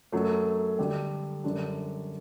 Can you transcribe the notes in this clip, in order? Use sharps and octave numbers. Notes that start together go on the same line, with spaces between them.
F#2 F#3 A3
D3 G3 D4 G4
F#2 D3 G3 D4